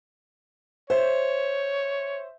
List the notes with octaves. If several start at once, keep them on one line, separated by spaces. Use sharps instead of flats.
C5 C#5 E5